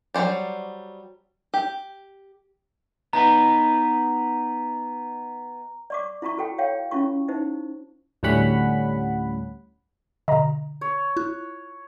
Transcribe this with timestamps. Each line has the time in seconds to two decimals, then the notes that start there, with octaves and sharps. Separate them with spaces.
0.14 F#3 G3 C#4 C5 D5
1.54 G4
3.13 B3 D#4 B4 A#5
5.90 D5 C#6 D6
6.22 E4 F4 A#5 C#6
6.37 F#4 A4 G5
6.58 C#5 F5 G5
6.91 C#4 E4 F4 C#6
7.28 D#4 E4 C5
8.23 D2 A2 G3 C#4 F#5 B5
10.28 B2 D3 D#5 A#5
10.81 C#5
11.17 E4 F4 F#6